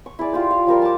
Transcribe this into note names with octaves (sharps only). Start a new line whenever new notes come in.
C#6
E4 G#4 D5
F4 G4 C5
F5
F3 G3 A#4 C6
A5 D6